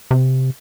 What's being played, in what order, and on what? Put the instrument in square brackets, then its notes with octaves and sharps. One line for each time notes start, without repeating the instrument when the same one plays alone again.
[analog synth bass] C3